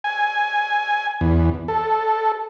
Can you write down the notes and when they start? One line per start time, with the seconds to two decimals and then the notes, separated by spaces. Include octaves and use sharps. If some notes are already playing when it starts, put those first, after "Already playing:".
0.04 G#5
1.21 E2
1.68 A4